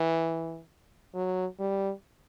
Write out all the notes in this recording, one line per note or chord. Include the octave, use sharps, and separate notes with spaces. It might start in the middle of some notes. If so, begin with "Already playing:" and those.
Already playing: E3
F#3
G3